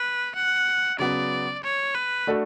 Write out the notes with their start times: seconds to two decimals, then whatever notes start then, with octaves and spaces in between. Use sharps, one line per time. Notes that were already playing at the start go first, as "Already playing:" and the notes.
Already playing: B4
0.35 F#5
0.99 C#3 F#3 B3 D5
1.64 C#5
1.95 B4
2.27 A3 D4 F#4 A4